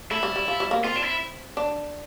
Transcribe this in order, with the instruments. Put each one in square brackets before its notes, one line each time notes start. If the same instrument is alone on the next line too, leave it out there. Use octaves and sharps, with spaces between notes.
[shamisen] A3 [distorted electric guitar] E4
[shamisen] G3
G3
F3
G3
A#3
[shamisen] C4 [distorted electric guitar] F4
[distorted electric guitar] D4
E4
[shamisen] D4